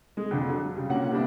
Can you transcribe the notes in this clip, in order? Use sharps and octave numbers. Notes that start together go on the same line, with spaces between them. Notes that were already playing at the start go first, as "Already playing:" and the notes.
G#3
F2 D3 F3
F#3
C#3 G3
A#2 D3 A#3 C#4 F#5
C3 G3 B3 D4 E4